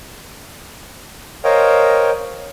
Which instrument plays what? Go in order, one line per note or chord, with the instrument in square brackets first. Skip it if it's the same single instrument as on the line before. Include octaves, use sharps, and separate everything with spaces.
[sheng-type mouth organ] A#4 C5 C#5 D#5 F5 G5